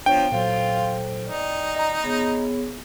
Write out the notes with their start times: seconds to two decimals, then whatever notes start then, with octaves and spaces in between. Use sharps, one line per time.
0.06 F3 B3 D4 C5 C#5 G5
0.32 A#2 F#3 F4 A4 C5
1.27 D#4 D5
1.76 D#5 A#5
2.04 B3 G#4 C#5